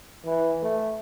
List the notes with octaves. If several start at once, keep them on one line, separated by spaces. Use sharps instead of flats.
E3
A3